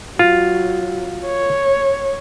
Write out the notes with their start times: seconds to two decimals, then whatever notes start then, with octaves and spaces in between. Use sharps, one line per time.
0.19 F#3 F4
1.26 C#5